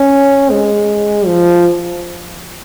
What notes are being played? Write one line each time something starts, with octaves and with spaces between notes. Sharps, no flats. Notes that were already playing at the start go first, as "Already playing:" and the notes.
Already playing: C#4
G#3
F3